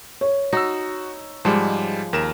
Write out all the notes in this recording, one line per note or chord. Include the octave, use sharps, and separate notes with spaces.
C#5
D#4 F#4 E6
G#2 F3 G3 G#3
D#2 A#4 E7